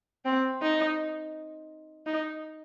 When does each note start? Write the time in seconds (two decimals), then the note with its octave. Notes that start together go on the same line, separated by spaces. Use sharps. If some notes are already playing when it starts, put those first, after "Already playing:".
0.25 C4
0.62 D#4
2.06 D#4